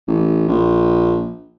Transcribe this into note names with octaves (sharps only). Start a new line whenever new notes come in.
A1
A#1